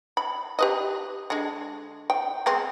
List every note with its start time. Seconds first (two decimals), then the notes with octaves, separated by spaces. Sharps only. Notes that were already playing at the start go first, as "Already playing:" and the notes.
0.17 B5
0.59 G4 B4 D#5
1.30 D3 G#3
2.10 G5
2.46 G#3 B3 C4